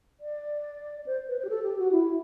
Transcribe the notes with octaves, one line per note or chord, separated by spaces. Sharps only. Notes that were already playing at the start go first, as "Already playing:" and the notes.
D5
C5
B4
C5
G4
A4
G4
F#4
E4